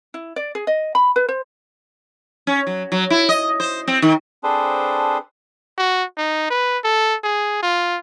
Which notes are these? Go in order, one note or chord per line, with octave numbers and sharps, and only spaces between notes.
E4
D5
G#4
D#5
B5
B4
C5
C#4
F#3
F#3
E4
D#5
C5
C4
D#3
C4 D4 G#4 A4 B4 C5
F#4
D#4
B4
A4
G#4
F4